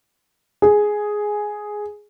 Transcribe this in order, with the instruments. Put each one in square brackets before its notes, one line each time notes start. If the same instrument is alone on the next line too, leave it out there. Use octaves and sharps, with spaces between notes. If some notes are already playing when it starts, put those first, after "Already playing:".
[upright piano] G#4